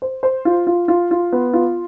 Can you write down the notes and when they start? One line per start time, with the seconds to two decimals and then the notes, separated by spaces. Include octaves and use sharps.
0.02 C5
0.23 C5
0.45 F4
0.67 F4
0.88 F4
1.11 F4
1.32 B3
1.53 F4